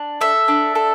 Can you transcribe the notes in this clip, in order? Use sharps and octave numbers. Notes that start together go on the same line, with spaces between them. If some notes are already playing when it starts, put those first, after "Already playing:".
Already playing: D4
A4 E5
D4
A4